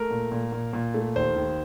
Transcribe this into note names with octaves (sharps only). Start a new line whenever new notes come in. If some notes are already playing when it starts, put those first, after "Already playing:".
Already playing: A3 A#4
A#2
A#2
A#2
A#2
A3
D#2 C5
D#2